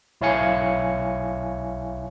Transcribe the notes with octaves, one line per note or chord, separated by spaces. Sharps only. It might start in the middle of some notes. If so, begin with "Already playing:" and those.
B1 E4 C#5 F5 G#5 C#7